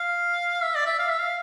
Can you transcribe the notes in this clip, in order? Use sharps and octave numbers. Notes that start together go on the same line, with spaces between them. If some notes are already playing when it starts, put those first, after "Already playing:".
Already playing: F5
E5
D5
E5
F5
E5
F5